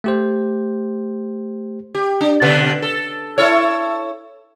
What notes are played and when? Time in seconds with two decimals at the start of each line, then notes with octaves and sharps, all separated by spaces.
0.04 A3 G4 C5
1.95 G4
2.21 D4
2.42 B2 D3 B4
2.82 A4
3.38 E4 A4 C#5